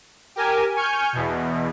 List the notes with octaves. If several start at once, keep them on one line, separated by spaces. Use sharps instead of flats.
G4 A#4 G#5
G#5 C#6 F6 G6
E2 B2